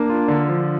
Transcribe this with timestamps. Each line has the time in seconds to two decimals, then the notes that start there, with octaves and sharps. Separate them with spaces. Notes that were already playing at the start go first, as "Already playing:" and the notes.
Already playing: A#3 D4
0.09 F4
0.28 D3
0.48 F3